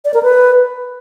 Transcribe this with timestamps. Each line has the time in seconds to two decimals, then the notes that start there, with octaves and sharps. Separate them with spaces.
0.05 D5
0.14 A#4
0.23 B4